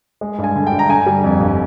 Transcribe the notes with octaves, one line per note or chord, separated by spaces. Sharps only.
G#3
G2
G#5
D3
G5
G2
A#5
D3 G#5
G3
F2
G1